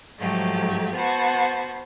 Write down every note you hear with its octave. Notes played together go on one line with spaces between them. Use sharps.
G#2 F3 F#3 A3 G4
B3 F#4 C5 F#5 A5